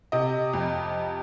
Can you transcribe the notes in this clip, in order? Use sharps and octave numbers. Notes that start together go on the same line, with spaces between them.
C3 D#5
F2